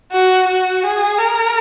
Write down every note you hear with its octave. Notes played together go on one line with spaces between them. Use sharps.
F#4
F#4
G#4
A#4